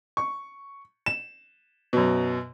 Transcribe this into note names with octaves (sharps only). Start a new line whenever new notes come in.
C#6
E7
F#2 B2